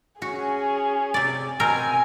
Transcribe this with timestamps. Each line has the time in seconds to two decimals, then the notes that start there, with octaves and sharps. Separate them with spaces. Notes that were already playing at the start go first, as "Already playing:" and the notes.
0.22 C#4 F#4 G#4
1.14 C3 D5
1.60 B2 C4 A#4 G#5